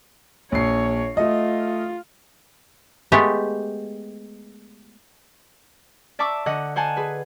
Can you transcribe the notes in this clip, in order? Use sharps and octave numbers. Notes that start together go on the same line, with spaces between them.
A#1 C#5 C7
A3 F4 D#5
G#3 A3 B3 G4
D5 E5 A5 C#6 D6 E6
D3 D#5 F#5
C5 F#5 G#5 A5
G#4 B4